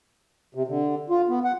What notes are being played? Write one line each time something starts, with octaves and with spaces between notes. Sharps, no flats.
C3
D3
F4
B3
F#5